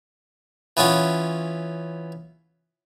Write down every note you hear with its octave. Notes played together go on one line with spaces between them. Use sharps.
E3 B3 C#4 F4